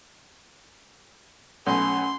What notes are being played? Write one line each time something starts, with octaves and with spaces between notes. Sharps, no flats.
B1 A3 C#4 G#5 B5 C6